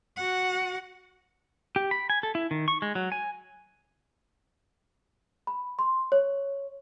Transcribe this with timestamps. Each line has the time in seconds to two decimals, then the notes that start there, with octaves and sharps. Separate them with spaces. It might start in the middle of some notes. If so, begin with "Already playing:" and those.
0.16 F#4 F#5
1.76 G4
1.91 B5
2.10 G#5
2.23 A4
2.35 E4
2.51 D#3
2.68 C#6
2.82 G#3
2.95 F#3
3.12 G#5
5.47 B5
5.79 C6
6.12 C#5